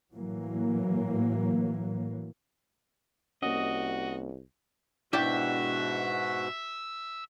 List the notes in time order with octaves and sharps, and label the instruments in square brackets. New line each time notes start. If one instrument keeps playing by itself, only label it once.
[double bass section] A2 E3 F#3 A#3
[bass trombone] C2 [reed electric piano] A#3 C#4 [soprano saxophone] F#4 [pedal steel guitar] D#5
[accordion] G#2 B2 F#4 [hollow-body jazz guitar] D4 E4 D5 [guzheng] G4 [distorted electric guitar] E5